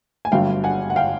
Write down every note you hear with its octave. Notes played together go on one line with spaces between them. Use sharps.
G#5
G1 G2 D3 F#3 F5 G5
F#5 G#5
F#5
F5 G5